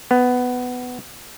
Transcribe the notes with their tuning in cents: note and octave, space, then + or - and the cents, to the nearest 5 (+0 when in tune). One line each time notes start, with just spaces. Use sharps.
B3 +10